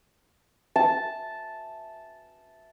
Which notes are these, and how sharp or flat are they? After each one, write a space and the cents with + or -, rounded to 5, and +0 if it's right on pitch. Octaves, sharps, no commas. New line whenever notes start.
A5 -5